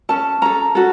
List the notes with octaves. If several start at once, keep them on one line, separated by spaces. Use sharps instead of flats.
C#4 A4 A5
C#4 A4 A#5
C#4 F#4 A4